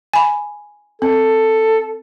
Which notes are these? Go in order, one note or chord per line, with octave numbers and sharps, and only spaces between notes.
G#5 B5
C4 A4